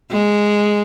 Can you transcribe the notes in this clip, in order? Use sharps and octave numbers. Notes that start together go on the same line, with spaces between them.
G#3